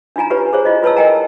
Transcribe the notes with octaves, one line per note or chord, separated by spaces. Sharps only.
D4 D#4 F4 G#5 A#5
F4 G4 B4 C#5
G#4 C5 C#5
E4 F4 D#5
F4 B4 C#5 A5 E6
A#4 D#5 G5 G#5 A#5